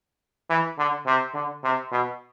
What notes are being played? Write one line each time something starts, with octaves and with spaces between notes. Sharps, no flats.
E3
D3
C3
D3
C3
B2